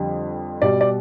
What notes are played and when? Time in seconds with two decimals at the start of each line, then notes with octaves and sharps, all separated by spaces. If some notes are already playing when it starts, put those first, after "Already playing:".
Already playing: F2 D3 G3
0.62 B2 G3 D5
0.81 D5